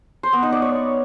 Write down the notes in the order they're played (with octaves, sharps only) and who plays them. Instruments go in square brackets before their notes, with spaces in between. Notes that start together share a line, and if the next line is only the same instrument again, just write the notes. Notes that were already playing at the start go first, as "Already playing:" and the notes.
[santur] C5
B3
D#4
D5
C#5